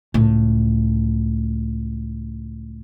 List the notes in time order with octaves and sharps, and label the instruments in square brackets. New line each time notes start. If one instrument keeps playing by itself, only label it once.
[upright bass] C#2 A2